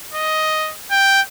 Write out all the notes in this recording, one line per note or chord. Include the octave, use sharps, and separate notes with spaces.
D#5
G5